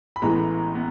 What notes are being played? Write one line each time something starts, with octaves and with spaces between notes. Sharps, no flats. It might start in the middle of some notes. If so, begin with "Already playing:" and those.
B5
A1 A2 E3 G#3 B3 A#5
B3